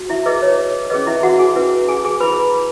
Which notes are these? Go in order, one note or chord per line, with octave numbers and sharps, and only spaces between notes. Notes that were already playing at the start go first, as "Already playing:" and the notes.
Already playing: F#4
E4 E5
E4 G#4 B4 D#5
C#5
C#4 G#4 B4 D#5
E4 E5
F#4 F#5
G#4 G#5
C#4 E4 B4
G#4 G#5
G#4 G#5
E4 B4 B5